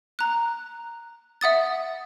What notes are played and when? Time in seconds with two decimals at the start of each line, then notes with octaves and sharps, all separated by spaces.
0.19 A#5 F#6
1.41 E5 F#5 D#6 A6